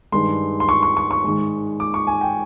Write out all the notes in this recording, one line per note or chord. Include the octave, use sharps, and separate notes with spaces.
G2 D#3 G#3 C6
C6
C#6
C#6
C#6
C#6
G#2 D#3 G#3
D6
C#6
G#5
G5